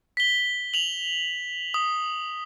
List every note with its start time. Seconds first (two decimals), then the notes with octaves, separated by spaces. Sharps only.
0.17 B6 G7
0.74 F7 F#7
1.74 D#6